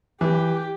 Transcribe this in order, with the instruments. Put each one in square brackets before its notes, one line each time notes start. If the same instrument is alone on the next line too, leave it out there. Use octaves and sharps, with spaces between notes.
[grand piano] E3 [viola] G4